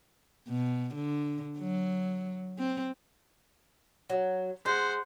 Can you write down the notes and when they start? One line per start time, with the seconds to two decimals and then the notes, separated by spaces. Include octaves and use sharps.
0.48 B2
0.95 D3
1.59 F#3
2.58 C4
4.10 F#3
4.66 G#3 C5 F#5